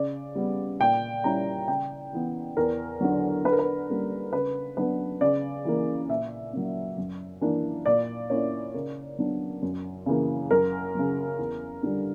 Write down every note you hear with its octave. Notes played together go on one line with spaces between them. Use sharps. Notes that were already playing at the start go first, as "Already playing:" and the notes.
Already playing: C#3 D5
G3 B3
A#2 G5
G3 C#4 E4 A#5
C#3 G5
E3 B3
E2 A#4
D3 F#3
D3 B4
A#4
B4
G3 A#3 C#4
C#3 B4
F#3 B3 D4 B4
C#3 D5
E3 A#3
A#2 E5
F#3 A#3 C#4
F#2
E3 A#3 D4
A#2 D5
A#3 C#4 E4 C#5
C#3 A#4
F#3 B3 D4
F#2
C#3 E3 A#3
F#2 A#4
C#3 F#3
E2
D3 G3